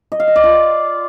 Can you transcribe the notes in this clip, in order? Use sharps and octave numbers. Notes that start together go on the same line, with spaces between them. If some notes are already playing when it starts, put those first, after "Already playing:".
D#5
F5
D#5
D5
F4